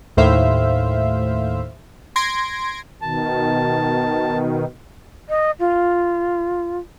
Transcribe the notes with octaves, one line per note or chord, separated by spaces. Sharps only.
D#2 A2 C5 E5 F5
C6 G#6 A#6 D7
B2 D#3 A5
D#5
F4